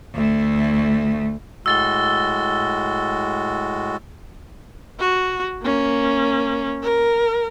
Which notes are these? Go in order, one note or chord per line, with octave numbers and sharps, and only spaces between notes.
D2 A3
A2 G#3 F#4 E6 A6 G7
F#4
A#3 C#4
A#4